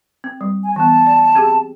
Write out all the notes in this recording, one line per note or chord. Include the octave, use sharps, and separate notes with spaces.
C4
G3
G#5
E3 B3 A5
D5
C4 G4 G#4